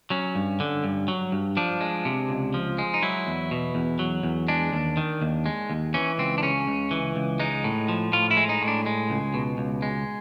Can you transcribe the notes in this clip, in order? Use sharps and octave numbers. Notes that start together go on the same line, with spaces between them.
F#3 C#4
G2
D3
G2
F#3
G2
F3 D4
G#3
C3
C#2
F3
G#3
D#4
F#3 E4
E2
B2
E2
F#3
E2
G#3 D4
D#2
D#3
D#2
G#3
D#2
E3 C#4
C#2 C4
D4
C#3 C#4
C#2
E3
C#2
G#3 D#4
A2
F3
A2 F4
E4
G#3
D#4
A2
D4
G#3
C#2
B2
C#2
G#3